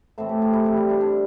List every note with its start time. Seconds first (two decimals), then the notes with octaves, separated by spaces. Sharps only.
0.18 A2 E3 A3 C4 C5
0.29 G4
0.42 G4
0.53 E4
0.65 C3 G3 C4
0.77 C4
0.90 D4
1.01 D4